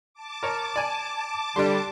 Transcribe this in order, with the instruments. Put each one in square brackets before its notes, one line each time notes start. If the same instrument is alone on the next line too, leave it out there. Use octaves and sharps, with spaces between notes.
[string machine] A5 D6
[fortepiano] A#4 C#5
D5 G#5
[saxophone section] D3 G3 [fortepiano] D4 C6